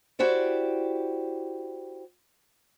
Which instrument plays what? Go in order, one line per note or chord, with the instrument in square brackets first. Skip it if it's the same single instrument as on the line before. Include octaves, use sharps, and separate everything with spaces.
[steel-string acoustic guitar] E4 F#4 G4 C5 D5